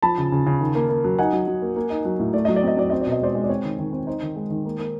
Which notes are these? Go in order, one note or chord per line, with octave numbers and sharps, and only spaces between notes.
F3 A5 B5
C#3
C#3
C#3
D#3
A#3
A#3
F#3
D#4 F#5 G#5
F#3
F#3
A#3
A#3
D#4
F#3
A2
A3 D5
F#3 D#5
D5
C4 D#5
F#3 D5
C4 D#5
D5
B2
D#5
G#3 C5 D5
G#3
D5
C4 C#5
D#3
D#3
C4
D#4 C5
D#3
G#3
D#3
A#3
A#3